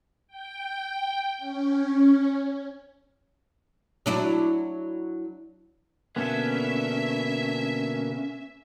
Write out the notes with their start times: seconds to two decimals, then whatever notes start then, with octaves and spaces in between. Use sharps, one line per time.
0.28 G5
1.38 C#4
4.06 F#3 D4 E4
6.16 B2 D3 A#3 B3 C#4 D4 A4 E5